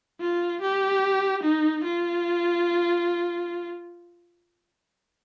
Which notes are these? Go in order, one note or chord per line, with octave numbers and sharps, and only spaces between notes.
F4
G4
D#4
F4